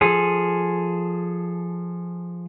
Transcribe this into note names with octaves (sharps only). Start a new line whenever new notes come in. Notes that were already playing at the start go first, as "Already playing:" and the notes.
F3 G#4 A4